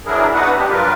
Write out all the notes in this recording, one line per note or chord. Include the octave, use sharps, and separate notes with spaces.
E3 F#3 D4 E4 G#4 A#4
B3 D4 D#4 F#4 B4 F#5
D4 G4
G2 F#3 F4 A#4 B4